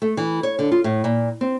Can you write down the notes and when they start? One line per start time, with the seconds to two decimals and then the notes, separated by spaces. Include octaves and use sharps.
0.02 A3
0.17 E3
0.43 C#5
0.59 D3
0.72 F4
0.84 A2
1.04 A#2
1.41 C4